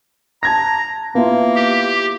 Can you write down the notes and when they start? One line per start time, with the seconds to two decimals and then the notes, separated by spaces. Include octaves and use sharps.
0.43 A5 A#5 G#6 A#6
1.15 A#3 B3 E4 F4
1.55 G4